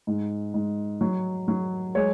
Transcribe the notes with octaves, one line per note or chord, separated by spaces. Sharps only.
G#2
G#2
F#3
F#3
G#3 C#5